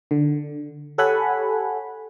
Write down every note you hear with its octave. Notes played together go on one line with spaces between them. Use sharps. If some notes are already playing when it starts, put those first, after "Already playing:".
D3
G4 A4 C#5 F#5 G#5 B5